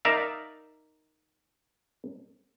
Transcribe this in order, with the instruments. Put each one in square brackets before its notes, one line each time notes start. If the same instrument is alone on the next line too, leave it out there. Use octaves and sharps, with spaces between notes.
[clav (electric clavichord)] D#4 A#4 D5 E5 F5